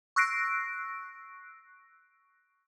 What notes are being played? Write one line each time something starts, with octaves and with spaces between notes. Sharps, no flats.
C#6 E6 F#6 A#6 C7 D7